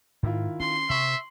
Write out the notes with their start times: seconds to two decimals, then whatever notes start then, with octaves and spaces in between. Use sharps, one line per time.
0.23 G#2 D#3 E4 F4
0.60 C#4 C6
0.90 C3 E5 C#6 F#7